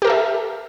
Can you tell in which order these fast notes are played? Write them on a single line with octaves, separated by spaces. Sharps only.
G4 A#4 A4 E5